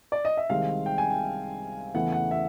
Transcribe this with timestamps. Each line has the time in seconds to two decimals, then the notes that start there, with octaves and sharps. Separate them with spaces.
0.12 D5
0.25 D#5
0.37 E5
0.50 C2 C3 D#3 G#3 C4 F5
0.86 G5
0.98 G#5
1.10 G5
1.94 E2 C#3 E3 A3 F#5
2.12 F#5
2.31 E5